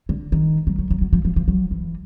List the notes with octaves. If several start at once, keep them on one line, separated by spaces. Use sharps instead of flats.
D3
D#3
F#3
F#3
F#3
F#3
F3
F3
F3
F#3
E3